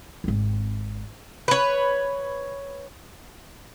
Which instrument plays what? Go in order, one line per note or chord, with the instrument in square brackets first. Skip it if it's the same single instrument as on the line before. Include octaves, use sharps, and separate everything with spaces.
[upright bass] G#1 C4
[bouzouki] B4 C#5